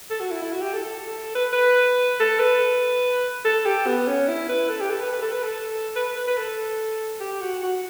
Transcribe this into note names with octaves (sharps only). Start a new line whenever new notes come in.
A4
F#4
E4
E4
F#4
G4
A4
A4
B4
B4
A4
B4
A4
G4
B3
C#4
E4
B4
A4
G4
A4
B4
B4
A4
B4
A4
B4
B4
B4
A4
G4
F#4
F#4